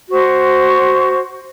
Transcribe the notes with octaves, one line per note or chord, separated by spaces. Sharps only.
F#4 C5 C#6